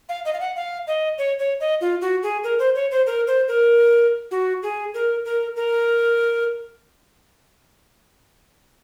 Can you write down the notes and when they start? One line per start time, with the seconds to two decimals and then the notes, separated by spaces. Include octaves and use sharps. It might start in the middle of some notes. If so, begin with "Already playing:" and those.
0.09 F5
0.25 D#5
0.33 F5
0.40 F#5
0.56 F5
0.87 D#5
1.18 C#5
1.39 C#5
1.60 D#5
1.81 F4
2.01 F#4
2.23 G#4
2.44 A#4
2.59 C5
2.75 C#5
2.91 C5
3.07 A#4
3.27 C5
3.48 A#4
4.31 F#4
4.63 G#4
4.94 A#4
5.25 A#4
5.56 A#4